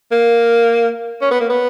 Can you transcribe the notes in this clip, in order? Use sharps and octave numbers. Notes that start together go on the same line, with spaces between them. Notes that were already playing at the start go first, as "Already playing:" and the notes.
A#3
C#4
B3
A#3
B3